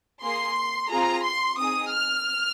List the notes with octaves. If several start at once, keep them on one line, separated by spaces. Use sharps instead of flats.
A#3 G#4 C6
C4 F4 G#4 A#5
C6
C4 D#4 G#4 D#6
F6